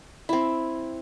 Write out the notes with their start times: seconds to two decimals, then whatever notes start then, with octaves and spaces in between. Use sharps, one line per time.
0.29 C4 E4